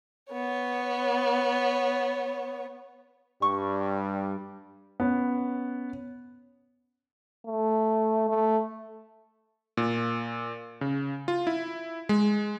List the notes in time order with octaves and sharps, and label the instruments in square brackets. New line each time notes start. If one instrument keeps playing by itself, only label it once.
[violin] B3 C#5
[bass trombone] G2 [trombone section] G3 [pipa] C#6
[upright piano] B3 C#4
[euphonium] A3
A3
[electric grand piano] A#2
C#3
F4
E4
G#3